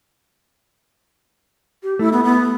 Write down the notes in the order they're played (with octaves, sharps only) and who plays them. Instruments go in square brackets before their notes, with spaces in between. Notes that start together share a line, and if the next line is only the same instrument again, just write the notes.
[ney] G4
[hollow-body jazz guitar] A3 [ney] E4
[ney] B3
B3